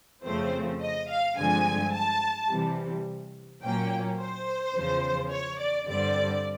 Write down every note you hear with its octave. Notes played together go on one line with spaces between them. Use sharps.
F2 C#3 F3 A3 C4 C5
D#5
F5
G2 D3 F3 G#3 C4 G#5
A5
C3 E3 G3
A#2 F#3 A#3 C#4 G5
C5
E2 C#3 F3
C#5
D5
G2 D3 G3 C4 D5